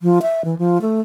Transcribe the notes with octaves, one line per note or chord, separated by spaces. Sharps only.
F3
E5
E3
F3
A3